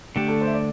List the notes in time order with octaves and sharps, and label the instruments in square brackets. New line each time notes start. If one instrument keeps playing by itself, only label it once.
[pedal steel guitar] D3 A3 D4 [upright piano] G4
[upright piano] A4
C5
E5
D5